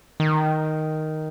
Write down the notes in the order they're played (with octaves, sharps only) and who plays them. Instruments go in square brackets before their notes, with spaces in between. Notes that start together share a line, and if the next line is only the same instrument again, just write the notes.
[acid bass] D#3